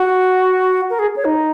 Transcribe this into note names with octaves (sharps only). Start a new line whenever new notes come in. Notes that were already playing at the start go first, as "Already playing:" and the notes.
Already playing: F#4
A#4
G#4
C#5
D#4